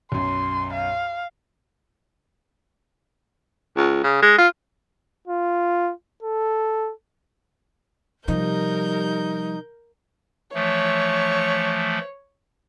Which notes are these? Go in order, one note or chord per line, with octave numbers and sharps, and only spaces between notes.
B1 F#2 C6
F5
C#2
C#3
G#3
F4
F4
A4
C3 F3 G3 D#4 A#4 G6
E3 F3 A3 C#5